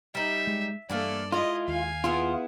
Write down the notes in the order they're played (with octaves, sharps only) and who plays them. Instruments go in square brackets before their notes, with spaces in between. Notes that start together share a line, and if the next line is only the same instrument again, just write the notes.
[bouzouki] G3 D#4 [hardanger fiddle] E5
[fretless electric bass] G#3
[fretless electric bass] G2 [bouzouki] E3 A3 A#3 [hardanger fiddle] A4 D5
[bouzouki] G#3 E4 [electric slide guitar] F4 [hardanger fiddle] D#5
[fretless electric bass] D#2 [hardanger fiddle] F5 G#5
[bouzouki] B3 E4 G#4 [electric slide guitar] F4